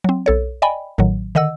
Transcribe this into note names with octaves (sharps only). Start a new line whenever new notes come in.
F#3 C4
B1 A4 C#5
D5 D#5 G5 G#5 B5
A1 A2 D#3 F#3
D3 D#3 D#5 F#5 E6